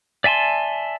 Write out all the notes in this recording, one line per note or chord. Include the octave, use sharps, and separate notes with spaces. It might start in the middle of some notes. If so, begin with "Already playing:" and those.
D5 E5 G#5 A5 C6